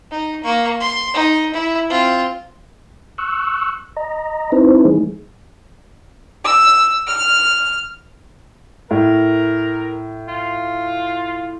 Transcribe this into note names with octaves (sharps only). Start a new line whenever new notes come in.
D#4
A#3 C#6
C6
D#4
E4
C4 F4
C#6 E6 F#6
D#5 A#5
C4 D#4 E4 B4 C5
E3 G3 A3 D#4 G#4
E6
F6
A2 A#4
F4